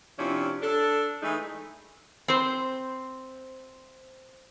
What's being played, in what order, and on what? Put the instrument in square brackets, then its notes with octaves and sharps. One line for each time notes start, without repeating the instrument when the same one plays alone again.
[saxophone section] C3 F3 C#4 D4 E4
D4 A4
E3 G#3 A3 D#4
[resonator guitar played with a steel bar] C4 C5